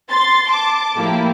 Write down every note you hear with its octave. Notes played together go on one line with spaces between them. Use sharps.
C6 A6
A5 D6
A2 F3 A#3 E4 G4